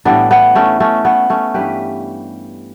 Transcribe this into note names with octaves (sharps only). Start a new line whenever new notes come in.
A2 E3 G3 B3 D4
B3
A3 C#4
A3 C#4
B3
A3 C#4
G2 E3 G3 G4 B4